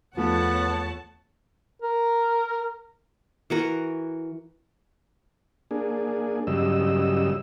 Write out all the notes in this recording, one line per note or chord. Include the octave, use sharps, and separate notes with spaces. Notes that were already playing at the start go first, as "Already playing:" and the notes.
E2 F3 A3 B3 C#5 F#5 A5
A#4
E3 F#4 A#4
A#3 D4 G#4
G2 C#3 F#3 G3 D#5 E6